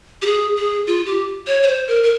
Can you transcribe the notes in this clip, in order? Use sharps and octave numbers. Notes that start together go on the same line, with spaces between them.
G4
G#4
G#4
F4
G4
C#5
C#5
C5
A#4
A#4